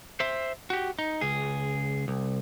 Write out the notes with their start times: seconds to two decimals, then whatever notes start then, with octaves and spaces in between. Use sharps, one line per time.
0.20 C5 E5
0.70 F#4 G4
0.99 D#4
1.21 C#2 G#4
2.08 C2